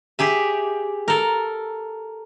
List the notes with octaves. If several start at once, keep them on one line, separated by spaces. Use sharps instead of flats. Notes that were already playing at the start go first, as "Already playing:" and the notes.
G4 G#4 E5
A4 A#4